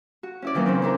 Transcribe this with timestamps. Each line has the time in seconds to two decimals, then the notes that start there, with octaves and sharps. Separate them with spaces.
0.23 F#4
0.42 C#4 E4 D5
0.54 D#3 E3 F#3 A#3 B3 D#4
0.66 C#3 C4 C#4
0.82 C4 D4 E4 A#4